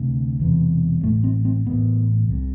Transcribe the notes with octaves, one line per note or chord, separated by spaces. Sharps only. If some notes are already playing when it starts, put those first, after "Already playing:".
Already playing: D2 C3
E1 E2 C3
A1 A2 A3
C4
C4
A1 A2 B3
C2 C3